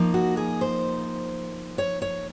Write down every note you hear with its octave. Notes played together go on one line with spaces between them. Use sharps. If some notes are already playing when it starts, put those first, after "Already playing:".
Already playing: F3 A#3 D#4
F#4
G#4
C5
C#5
C#5